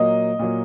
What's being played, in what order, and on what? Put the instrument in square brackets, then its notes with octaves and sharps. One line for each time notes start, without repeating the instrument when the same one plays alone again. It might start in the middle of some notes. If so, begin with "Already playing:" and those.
Already playing: [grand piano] A#2 F#3 A#3 [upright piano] D#5
[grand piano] A#2 F#3 A#3